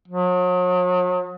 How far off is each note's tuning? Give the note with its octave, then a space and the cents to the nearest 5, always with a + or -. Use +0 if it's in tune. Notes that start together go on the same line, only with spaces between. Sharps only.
F#3 -40